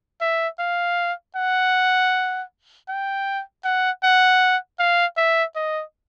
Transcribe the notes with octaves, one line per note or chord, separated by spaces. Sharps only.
E5
F5
F#5
G5
F#5
F#5
F5
E5
D#5